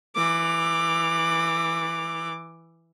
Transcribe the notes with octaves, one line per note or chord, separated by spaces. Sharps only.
E3 D6